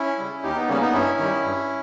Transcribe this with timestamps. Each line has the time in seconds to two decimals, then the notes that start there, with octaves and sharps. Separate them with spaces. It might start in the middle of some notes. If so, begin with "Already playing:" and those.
Already playing: C#4 E4
0.18 C#3 G3
0.43 D#2 D#4 G4
0.55 B3 D#4
0.68 C#3 G3 A#3 C#4
0.81 B3 D#4
0.93 G2 C#4 E4
1.19 D#3 G3
1.43 G2